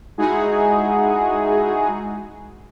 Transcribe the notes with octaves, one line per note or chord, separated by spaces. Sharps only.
G#3 D#4 E4 F#4 G#4